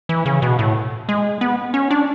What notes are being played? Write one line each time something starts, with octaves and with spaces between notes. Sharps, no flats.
E3
C#3
B2
A2
G#3
B3
C#4
D4